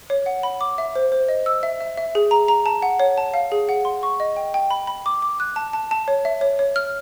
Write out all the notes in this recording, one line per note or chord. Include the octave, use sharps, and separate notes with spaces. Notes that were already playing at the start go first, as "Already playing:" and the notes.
C#5
F#5
B5
D6
E5
C5
C5
D#5
E6
E5
E5
E5
G#4
A#5
A#5
A5
F#5
C#5
A5
F5
G#4
F#5
C6
C#6
D#5
G5
G5
B5
B5
D6
D6
F#6
A5
A5
A5
C#5
E5
C#5
C#5
F6